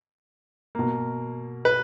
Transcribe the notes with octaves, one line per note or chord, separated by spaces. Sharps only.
B2 A#3
B4